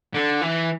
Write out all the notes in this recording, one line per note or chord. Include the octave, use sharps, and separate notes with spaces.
D3
E3